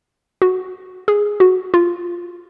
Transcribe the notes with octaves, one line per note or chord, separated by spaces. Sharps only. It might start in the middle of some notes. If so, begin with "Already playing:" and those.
F#4
G#4
F#4
F4